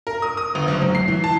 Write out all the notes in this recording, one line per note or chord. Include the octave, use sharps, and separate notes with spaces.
A#4
D#6
D#6
G1
F#1
F#3
C7
E3
A5